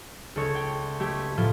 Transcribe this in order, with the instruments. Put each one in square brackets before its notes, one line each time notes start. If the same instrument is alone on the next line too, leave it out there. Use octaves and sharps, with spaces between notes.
[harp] C#2 A4 C#5 G#6
G5
A3 G4 G#6
A2 F3 F4